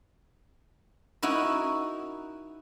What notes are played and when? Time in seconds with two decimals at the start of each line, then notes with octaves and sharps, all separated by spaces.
1.23 D#4 E4 F#4 A#4